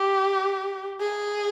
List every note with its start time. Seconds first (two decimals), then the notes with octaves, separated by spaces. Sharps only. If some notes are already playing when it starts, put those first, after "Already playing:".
Already playing: G4
1.00 G#4